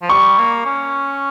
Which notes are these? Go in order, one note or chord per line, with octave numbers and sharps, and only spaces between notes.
F3
G3 C#6
A#3
C#4